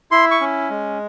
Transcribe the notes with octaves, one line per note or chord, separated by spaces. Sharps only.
E4 C6
C#6
C#4
G#3